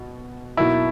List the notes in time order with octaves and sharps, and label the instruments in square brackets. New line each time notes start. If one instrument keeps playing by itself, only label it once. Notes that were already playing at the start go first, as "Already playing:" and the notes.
Already playing: [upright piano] B2
[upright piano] B2 F#3 A#3 D#4 [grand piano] E4